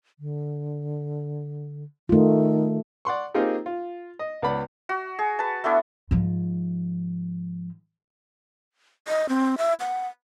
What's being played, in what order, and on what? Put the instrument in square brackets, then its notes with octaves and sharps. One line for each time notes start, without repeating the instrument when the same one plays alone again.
[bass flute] D3
[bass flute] D#3 [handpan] A3 F4
[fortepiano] D5 F#5 C6 C#6
A#3 C4 D#4 F4 G4 G#4
F4
D#5
C#2 B3 D5 F#5 B5
[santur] F#4
G#4
B4 A5
A3 B3 D4 E4
[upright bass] G#2 F3
[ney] D#5
C4
E5
F#5